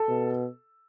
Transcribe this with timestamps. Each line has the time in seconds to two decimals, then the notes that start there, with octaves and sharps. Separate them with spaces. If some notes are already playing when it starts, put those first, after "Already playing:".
Already playing: A4
0.08 B2